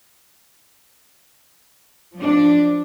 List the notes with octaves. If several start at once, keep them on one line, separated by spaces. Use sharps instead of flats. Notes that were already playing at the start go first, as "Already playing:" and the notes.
F3 D4